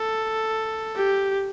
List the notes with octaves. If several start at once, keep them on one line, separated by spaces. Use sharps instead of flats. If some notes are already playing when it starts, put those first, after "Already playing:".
Already playing: A4
G4